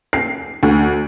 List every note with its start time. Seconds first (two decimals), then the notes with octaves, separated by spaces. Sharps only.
0.13 C7
0.63 D2